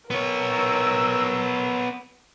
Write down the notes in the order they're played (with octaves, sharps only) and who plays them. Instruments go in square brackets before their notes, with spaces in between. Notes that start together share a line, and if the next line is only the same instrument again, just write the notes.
[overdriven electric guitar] B3 C#5 [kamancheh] A#4 E6